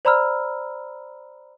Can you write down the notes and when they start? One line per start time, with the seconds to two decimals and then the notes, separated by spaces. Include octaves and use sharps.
0.05 C5 D5 A#5 B5 E6 F6